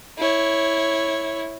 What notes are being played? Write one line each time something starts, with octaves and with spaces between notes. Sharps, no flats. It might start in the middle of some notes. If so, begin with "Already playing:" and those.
E4 C#5